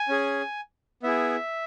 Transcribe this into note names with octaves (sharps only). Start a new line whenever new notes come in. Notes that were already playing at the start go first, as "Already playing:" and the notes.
Already playing: G#5
C#4 G#4
B3 E4 G#4 E5